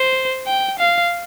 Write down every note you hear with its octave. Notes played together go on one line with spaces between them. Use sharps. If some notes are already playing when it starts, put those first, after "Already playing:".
Already playing: C5
G5
F5